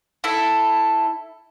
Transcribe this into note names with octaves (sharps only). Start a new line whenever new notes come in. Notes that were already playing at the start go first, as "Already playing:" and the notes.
E4 A4